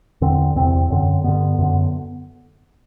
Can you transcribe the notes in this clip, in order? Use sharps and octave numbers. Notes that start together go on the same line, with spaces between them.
E2 D3 C4
E2 C3 C4
F#2 D3
G2 D3 B3
F#2 D3